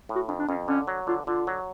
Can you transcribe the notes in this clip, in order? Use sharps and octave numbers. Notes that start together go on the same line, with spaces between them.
A2
F#4
F2 D4
D4
F2 C#4
D3 C#4
F#3
D3 F4
D3 F4
F#3